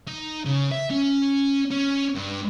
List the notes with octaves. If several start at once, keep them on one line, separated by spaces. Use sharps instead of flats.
D#4
C#3
E5
C#4
C#4
G2